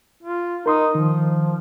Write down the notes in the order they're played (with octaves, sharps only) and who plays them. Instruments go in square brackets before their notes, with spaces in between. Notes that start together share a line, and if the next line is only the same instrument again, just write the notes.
[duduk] F4
[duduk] D#4 [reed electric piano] A#4 C6 D#6
[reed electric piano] D#3 [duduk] F3